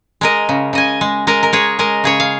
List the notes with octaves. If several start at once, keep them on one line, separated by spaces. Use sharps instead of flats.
G#3 A#4 D#5
C#3
C#3 D#5 G#5
G#3
G#3 A#4 D#5
A#4
G#3 G#4 C#5
G#3 A#4 D#5
C#3 G#4 C#5
F5